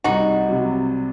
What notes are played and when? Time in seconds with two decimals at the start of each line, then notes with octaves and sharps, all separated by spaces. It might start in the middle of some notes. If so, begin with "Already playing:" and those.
0.04 C2 D#4 F#4
0.49 C3 F#3